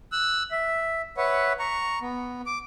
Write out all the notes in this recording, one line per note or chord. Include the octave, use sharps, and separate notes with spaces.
E6 F#6
E5
B4 C#5 E5 F#5
A#5 C#6
B3
D6